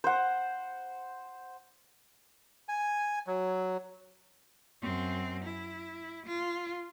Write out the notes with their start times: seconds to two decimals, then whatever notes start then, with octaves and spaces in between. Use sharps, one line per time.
0.04 C5 F#5
2.69 G#5
3.27 F#3
4.82 F#2 C4
5.44 E4
6.26 F4